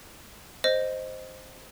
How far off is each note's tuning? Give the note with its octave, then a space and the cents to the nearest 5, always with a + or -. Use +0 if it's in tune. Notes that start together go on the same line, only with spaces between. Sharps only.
C5 +0 D#5 -5